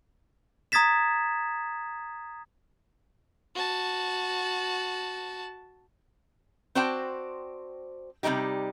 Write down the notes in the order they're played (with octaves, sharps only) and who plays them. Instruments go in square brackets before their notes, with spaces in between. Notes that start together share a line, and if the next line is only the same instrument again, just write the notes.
[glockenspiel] A#5 D#6 G#6 A6 B6 E7
[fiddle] F#4 A5
[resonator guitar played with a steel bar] C4 F#4 C5 D5 G5 A5
C3 F3 G3 D#4 G4